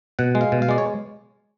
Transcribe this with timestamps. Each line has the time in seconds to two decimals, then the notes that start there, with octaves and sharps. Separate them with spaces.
0.19 B2 F#5
0.35 G#3
0.41 F5
0.52 B2
0.62 F5
0.69 G#3 D5
0.78 C#5